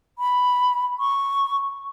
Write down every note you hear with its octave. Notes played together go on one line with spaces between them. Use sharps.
B5
C#6